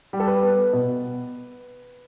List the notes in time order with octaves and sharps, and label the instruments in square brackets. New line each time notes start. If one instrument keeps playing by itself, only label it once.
[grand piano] G3
A4
B4
B3
B2